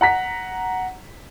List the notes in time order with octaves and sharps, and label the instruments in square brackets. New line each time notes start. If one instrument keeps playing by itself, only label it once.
[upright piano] F#5 A#5 B6